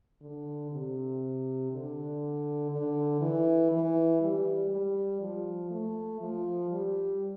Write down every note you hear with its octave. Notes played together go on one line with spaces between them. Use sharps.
D3
C3
D3
D3
E3
E3
G3
G3
F3
A3
F3
G3